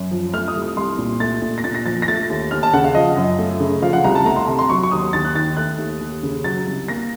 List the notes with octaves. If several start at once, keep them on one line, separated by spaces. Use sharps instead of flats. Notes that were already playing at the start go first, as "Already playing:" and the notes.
Already playing: F#2
F3
A3 F6
D#6
C2
D#6
C2 C6
A#2
A3 A6
A#2
A#6
A#2 A6
A#6
F3 A6
A#6
A3 A6
D#2
D#2 F6
A5
C#3 F#5
F5
F3 D#5
F#2
A3
C#3
F3 F5
F#5
C2 A#5
A5
A3 A#5
C6
C3 A#5
C6
F#3 C#6
C#6
D#2 D#6
D#2 A6
F#6
D#3 A6
A3 F#6
D#2
D#2
C#3
F#3 A6
C2
A#3 A#6